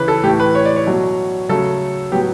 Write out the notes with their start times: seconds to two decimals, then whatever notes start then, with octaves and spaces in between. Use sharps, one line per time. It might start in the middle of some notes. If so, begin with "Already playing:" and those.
Already playing: C#3 E3 B4
0.08 A4
0.23 A2 E3 A3 G4
0.40 B4
0.55 C#5
0.65 D5
0.76 C#5
0.87 B2 F#3 A3
1.49 C#3 F#3 A3 A4
2.12 A2 F#3 B3 G4